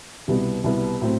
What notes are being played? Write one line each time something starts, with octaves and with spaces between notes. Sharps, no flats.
C2 B2 G3 B3 E4
C2 B2 G3 B3 E4
A2 F#3 A3 C4